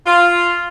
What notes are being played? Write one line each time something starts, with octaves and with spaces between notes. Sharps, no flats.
F4